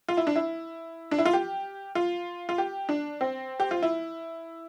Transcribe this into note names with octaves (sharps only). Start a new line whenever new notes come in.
F4
E4
D4
E4
D4
E4
F4
G4
F4
F4
G4
D4
C4
G4
F4
E4